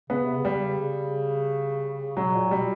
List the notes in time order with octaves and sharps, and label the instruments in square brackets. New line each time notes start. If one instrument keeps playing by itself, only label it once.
[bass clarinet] C#3 [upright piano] B3
[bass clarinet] C3
C#3
[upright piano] G3
[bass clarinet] C#3
[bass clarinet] B2 [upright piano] F#3
[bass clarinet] A#2
[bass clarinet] B2 [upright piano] G3